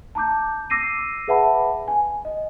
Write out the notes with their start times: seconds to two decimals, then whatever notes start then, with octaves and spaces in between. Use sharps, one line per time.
0.15 A5 A#5 D6 G6
0.70 D6 E6 A#6 C7 D#7
1.28 G#4 B4 E5 F#5 A5 B5
1.88 G#5
2.25 D#5